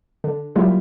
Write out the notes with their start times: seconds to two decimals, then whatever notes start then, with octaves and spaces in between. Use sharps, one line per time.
0.24 D3
0.56 F#3 G3 A#3 E4 F4 G4